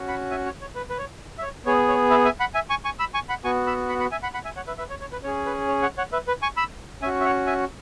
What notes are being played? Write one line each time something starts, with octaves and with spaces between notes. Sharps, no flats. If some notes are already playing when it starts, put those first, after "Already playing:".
Already playing: C#4 F#4
F#5 B5
E5 G#5
C#5
C#5
B4
B4
C#5
E5
C#5
B3 G#4 C#5
C#5
B4 E5
E5 G#5
F#5 B5
E5 G#5
G#5 C#6
G#5 C#6
B5 E6
G#5 C#6
F#5 B5
B3 F#4 G#5 C#6
B5 E6
F#5 B5
F#5 B5
E5 G#5
F#5 B5
F#5 B5
E5 G#5
C#5 F#5
B4 E5
B4 E5
C#5
C#5
B4
C#4 G#4 C#5
B4
C#5
C#5 F#5
C#5 F#5
B4 E5
B4
G#5 C#6
B5 E6
C#4 F#4 E5 G#5
E5
C#5 F#5
E5 G#5